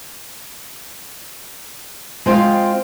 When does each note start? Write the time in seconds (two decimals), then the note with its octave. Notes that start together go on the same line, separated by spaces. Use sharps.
2.26 G#3 C4 F4 F5 G5